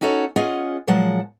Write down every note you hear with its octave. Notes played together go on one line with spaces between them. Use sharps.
C#4 D#4 F#4 A4 C#5
C#4 F4 G#4 D#5 F#5
A#2 F3 F#3 G#3 F#5 A5